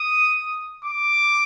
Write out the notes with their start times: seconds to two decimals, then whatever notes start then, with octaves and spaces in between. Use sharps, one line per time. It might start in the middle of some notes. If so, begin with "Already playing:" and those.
Already playing: D#6
0.85 D6